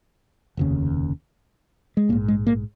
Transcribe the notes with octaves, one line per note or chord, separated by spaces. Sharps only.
F1 D#2 C#3
G#3
A#1 G#2 A#3
G#3
A#3